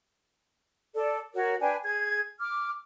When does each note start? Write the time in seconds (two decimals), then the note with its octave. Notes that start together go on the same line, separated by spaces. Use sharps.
0.94 A4 D5
1.34 F#4 A#4 C#5
1.61 D4 B4 G5 G#5
1.84 G#4 G#6
2.39 D6 F6